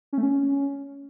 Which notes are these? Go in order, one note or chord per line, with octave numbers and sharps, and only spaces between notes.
C#4
A3
C#4